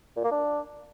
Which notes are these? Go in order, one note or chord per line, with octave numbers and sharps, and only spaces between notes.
A#2
A#3
D4